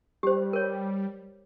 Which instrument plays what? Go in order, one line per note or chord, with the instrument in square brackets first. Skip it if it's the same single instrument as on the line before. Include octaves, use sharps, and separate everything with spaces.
[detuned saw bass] G3 [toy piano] G4 C5
[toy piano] A#4 C#5